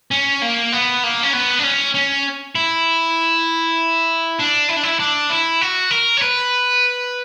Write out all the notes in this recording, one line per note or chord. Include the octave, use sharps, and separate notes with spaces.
C#4
A#3
B3
A#3
C#4
B3
D4
C#4
C#4
E4
D4
E4
D4
E4
D4
E4
F#4
A#4
C#5
B4